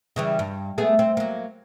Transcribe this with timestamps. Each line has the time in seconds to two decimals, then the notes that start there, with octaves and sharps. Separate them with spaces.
0.16 C#3 E3 G3
0.39 G2
0.78 A3 B3 G#4
0.99 C4
1.17 F#3 A#3